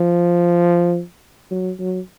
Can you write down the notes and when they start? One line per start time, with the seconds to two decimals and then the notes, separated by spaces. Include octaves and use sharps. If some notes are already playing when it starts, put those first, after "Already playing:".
Already playing: F3
1.51 F#3
1.80 F#3